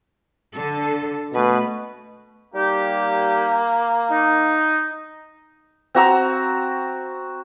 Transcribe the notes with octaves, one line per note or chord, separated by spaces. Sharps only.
D3 A4
B2 A3 B4
G3 A#3 D#4 G4
D#4
C4 F#4 A#5 E6